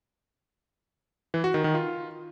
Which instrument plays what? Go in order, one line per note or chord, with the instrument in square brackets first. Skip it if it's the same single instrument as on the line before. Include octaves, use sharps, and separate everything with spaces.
[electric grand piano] E3
F#4
D#3
D#3
F4